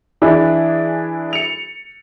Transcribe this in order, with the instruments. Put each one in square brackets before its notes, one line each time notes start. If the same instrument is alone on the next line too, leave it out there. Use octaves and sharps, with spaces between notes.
[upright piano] E3 D4 E4 G#4
C#7 F7